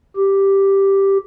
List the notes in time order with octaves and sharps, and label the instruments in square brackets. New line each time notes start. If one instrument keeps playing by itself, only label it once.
[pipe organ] G4